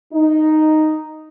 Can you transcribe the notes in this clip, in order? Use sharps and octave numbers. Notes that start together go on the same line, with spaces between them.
D#4